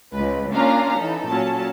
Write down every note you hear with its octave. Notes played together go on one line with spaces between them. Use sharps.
C#2 G#3 B4
A#3 C#4 D4 F4 F5 A#5
E3 D#4 A4
A#2 F#3 C#4 A5